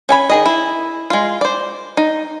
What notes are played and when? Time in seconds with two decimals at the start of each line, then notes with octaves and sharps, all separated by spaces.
0.09 C#4 G#5 B5
0.30 D#3 G#4 D#5
0.46 E4
1.10 G#3 F4
1.41 C5 D5
1.97 D#4